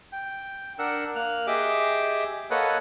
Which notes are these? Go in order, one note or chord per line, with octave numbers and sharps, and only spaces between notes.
G5
D4 A#4 F#5 E6
A#3 F6 F#6
G4 G#4 D#5 E5 D6
A#3 A4 B4 C#5 D#5 F#5